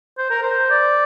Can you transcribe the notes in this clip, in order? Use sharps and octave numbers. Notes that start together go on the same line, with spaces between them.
C5
A#4
C5
D5